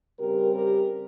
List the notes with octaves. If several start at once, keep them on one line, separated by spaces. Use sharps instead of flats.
C#3 G3 C4 G4 A#4
G4 A#4